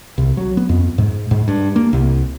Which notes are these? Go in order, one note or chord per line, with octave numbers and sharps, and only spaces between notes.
C2
F#3
B3
F2
G#2
G#2
G2
A#3
C2